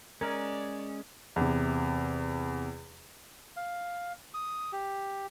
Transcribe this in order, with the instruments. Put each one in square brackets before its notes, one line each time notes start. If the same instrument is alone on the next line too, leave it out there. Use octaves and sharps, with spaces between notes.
[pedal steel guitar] G#3 C#4 [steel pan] A#4 [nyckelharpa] D5
[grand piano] E2 C3
[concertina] F5
D#6
G4